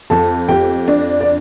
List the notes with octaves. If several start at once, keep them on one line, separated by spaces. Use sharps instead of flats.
F2 A4 A5
F2 G4 G5
D4
D5